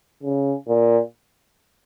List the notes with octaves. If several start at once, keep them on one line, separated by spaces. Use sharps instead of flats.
C#3
A#2